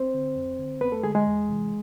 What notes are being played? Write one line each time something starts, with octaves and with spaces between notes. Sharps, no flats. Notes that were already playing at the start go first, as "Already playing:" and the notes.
Already playing: C4 C5
D3
F2
D3
F2 B3 B4
A3 A4
D3 G#3 G#4
G#3 G#4
E2
C3 E3